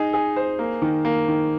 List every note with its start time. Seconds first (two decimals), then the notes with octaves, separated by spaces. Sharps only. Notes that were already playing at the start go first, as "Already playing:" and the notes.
Already playing: D#4 G#4
0.13 G#4
0.36 C5
0.59 A#3
0.82 D#3
1.05 A#3
1.28 D#3